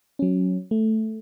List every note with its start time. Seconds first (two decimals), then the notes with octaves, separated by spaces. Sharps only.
0.19 F#3 C#4
0.71 A3